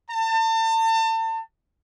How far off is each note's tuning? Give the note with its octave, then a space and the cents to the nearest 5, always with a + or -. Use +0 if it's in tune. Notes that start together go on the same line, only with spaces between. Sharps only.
A5 +35